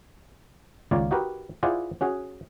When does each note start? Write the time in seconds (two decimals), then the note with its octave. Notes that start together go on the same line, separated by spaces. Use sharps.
0.91 C#2 D#3 A#3 F4 C#5 D5
1.11 D#4 F#4 G4 A#4 B4
1.63 E4 F4 G#4 C5 D5 F#5
2.01 C#4 F#4 G#4